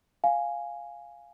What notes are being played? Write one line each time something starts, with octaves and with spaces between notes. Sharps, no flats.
F5 G#5